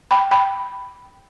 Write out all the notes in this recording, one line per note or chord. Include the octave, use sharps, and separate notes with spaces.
G5 B5
G5 B5